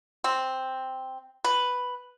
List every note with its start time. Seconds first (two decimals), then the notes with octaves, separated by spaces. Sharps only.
0.24 C4
1.44 B4